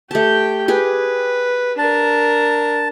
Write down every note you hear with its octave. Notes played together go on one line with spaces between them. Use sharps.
A3 G4 G5 A5
G4 G#4 B4
D4 A#4 A5